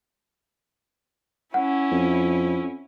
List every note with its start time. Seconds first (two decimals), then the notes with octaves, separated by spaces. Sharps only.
1.54 C#4 E4 F#5
1.92 F2